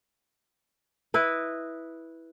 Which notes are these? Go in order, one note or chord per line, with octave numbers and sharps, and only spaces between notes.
E4 B4 D#5